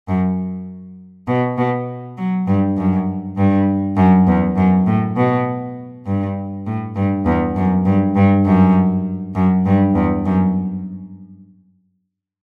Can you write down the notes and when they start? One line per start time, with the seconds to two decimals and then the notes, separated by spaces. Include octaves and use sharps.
0.08 F#2
1.28 B2
1.58 B2
2.17 F#3
2.47 G2
2.77 F#2
3.37 G2
3.97 F#2
4.27 E2
4.57 F#2
4.87 A2
5.17 B2
6.06 G2
6.66 A2
6.96 G2
7.26 E2
7.56 F#2
7.86 G2
8.16 G2
8.45 F#2
9.35 F#2
9.65 G2
9.95 E2
10.25 F#2